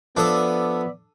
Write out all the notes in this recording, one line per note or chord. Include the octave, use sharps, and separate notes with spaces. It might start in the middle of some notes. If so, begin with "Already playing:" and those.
F3 B3 D4 A4 D5 E5 D#6